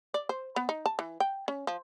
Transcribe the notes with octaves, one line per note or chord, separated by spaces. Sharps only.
D5
C5
B3
D#4
A5
E3
G5
C#4
F3